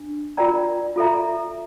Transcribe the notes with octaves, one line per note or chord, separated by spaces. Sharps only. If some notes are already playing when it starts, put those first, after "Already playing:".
Already playing: D4
F4 A#4 D5 G5 A#5
F4 A4 E5 A#5